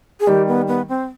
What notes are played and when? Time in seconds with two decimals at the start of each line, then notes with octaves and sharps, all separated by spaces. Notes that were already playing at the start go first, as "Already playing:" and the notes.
0.20 G#4
0.27 D#3 G3 G4
0.48 B3
0.68 B3
0.89 C4